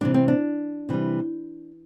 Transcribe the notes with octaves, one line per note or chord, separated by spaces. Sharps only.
C3 E3 G3 D4
C4
D4
C3 E3 G3